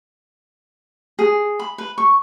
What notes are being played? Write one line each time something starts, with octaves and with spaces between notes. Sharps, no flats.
G#4
B5
B4
C#6